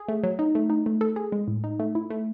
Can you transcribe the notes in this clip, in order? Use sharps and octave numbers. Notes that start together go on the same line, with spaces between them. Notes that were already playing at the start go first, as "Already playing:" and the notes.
Already playing: G#4
A3
F#3
D#4
A3
D#4
A3
A4
G#4
G#3
A2
D#4
A3
E4
A3